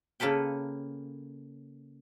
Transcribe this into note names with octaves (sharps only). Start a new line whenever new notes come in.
C#3 A#3 A4 B4 G5